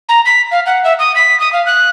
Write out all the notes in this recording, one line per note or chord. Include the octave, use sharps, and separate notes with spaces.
A#5
B6
F5
F#5
E5
D#6
B6
D#6
F5
F#6